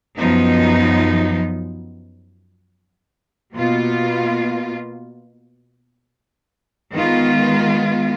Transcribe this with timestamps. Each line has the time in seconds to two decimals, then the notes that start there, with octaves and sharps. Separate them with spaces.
0.17 F#2 F3 B3 D#4
3.55 B2 A#3 F4
6.92 D#3 G#3 B3 F4